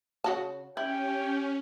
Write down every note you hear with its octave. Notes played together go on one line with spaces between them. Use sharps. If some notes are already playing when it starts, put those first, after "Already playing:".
C#3 F#4 A5
C#4 E4 G4 G5